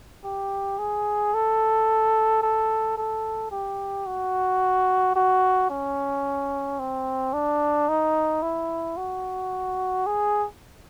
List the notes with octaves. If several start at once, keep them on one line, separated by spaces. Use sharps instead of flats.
G4
G#4
A4
A4
A4
G4
F#4
F#4
C#4
C4
D4
D#4
E4
F#4
G#4